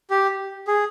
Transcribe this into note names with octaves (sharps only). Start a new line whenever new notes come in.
G4
G#4